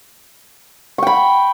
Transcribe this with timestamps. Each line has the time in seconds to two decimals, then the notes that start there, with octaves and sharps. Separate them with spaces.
0.98 C#6
1.03 G5
1.07 B5